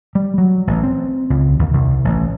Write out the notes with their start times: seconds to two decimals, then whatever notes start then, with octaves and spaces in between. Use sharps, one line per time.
0.15 G3
0.38 F#3
0.67 A1
0.84 C4
1.30 C#2
1.59 D#2
1.73 C2
2.05 A1